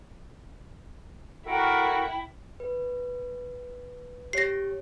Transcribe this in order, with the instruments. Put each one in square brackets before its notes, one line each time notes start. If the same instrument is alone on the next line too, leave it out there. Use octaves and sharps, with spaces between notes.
[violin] E4 [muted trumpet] F#4 [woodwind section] A4 A#4 [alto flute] G5
[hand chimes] B4
[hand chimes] G4 C#5 [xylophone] A#6 C7